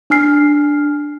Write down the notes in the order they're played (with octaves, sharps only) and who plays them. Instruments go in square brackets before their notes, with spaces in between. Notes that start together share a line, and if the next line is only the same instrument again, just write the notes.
[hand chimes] D4 G#5 F6 C7